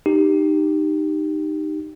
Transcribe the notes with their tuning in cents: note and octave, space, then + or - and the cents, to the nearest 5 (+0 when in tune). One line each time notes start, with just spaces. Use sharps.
D#4 -15 G4 +0